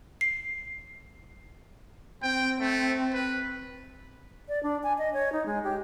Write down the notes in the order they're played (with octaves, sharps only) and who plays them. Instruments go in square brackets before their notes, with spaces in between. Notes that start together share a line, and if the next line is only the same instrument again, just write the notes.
[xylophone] C7
[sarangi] C4 [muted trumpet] G5
[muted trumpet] A3 [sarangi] C4
[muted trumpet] B4
[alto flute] D5
D4
G#5
D#5
C#5
D#4
G#3
G4